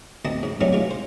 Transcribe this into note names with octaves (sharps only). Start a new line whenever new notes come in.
D2 C4 D#5 A5
G#2
G2 F#3 A3 C4 C#4 D#4
G#3 F4
C5